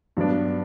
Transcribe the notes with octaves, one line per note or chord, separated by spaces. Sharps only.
G2 F#3 B3 D4